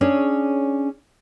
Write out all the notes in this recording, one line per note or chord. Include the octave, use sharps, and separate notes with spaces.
C#4 D4 G#4 C#5